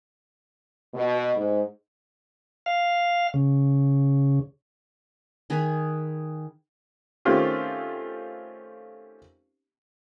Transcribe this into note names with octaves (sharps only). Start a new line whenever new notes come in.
B2
G#2
F5
C#3
D#3 G#4 B4
D#3 A3 C4 C#4 F4 G4